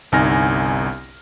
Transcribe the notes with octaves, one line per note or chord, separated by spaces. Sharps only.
G1 C2 D#4 G#5 F6 A#6